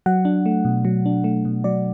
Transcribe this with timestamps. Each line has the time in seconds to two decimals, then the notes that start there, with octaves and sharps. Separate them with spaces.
0.06 F#3 F#5
0.25 D4
0.46 A3
0.65 B2
0.85 F#3
1.06 D4
1.24 A3
1.45 B2
1.64 F#3 D5